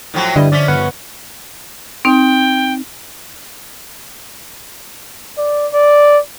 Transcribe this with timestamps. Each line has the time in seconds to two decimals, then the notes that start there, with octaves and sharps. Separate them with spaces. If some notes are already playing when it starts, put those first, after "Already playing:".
0.14 A2 F3 F#3
0.36 G2 D3 G3 E4 D#5
0.52 F3 C#4 D5 E5
0.68 G1 B4 F#5
2.05 C4 D#4 G5
5.38 D5
5.73 D5